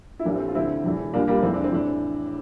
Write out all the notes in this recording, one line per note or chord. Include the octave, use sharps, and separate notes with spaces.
E4
A1 A2 E3 A#3 D4
A3 C4
F4
D2 D3 C4 E4
E1 E2 E3
C2 A#2 A#3 D4
G3 A#3
F1 E2 E3 C4
D4
C4
A2 E3 D4